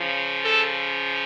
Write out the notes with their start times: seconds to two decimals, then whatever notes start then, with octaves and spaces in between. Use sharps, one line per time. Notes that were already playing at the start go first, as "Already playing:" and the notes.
Already playing: C#3 F3
0.44 A4